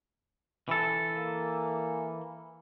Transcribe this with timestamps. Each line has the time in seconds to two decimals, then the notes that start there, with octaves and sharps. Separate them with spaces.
0.69 E3 A4
1.16 A#3